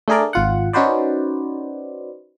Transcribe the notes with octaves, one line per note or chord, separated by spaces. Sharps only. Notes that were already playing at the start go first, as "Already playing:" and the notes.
A3 D4 G#4 A#4 D5
G#1 F4 F#5
C#4 D#4 F#4 B4 C5 D5